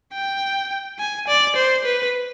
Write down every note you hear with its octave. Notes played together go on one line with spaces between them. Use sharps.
G5
G#5
D5
C5
B4